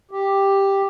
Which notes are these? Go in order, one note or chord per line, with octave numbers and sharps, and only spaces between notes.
G4